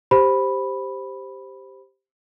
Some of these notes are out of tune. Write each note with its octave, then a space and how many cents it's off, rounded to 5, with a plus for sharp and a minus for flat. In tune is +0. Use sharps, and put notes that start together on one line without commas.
G4 +0 C5 +0 B5 +0